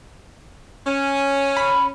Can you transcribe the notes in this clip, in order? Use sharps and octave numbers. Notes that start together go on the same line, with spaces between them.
C#4
B5